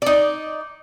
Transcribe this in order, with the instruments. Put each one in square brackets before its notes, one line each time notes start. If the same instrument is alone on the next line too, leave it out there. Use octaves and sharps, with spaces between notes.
[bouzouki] D#4 D5